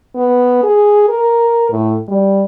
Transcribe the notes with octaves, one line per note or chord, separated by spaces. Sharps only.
B3
G#4
A#4
A2
G3